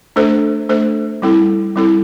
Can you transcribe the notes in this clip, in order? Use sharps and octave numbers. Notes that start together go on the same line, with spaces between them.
A3 D4 A4 C5
A3 D4 A4 C5
G3 C4 E4 A4
G3 C4 E4 A4